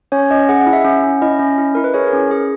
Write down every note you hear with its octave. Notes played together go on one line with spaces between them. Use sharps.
C#4 C#5
C#4 D#5
G#4 F#5
F#5
E4
E5
C#4
C#4
E4 D#5
C#4
E4
E4 A#4
B4
G#4 C#5
A#4
C#4
G#4